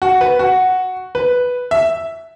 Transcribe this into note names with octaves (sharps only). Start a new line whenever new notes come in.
F#4
B4
F#4
B4
E5